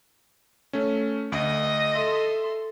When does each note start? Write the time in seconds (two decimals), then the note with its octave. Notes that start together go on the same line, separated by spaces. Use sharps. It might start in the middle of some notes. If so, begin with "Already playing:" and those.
0.73 A3 C#4
1.32 D2 D#5
1.95 A4 E5 C6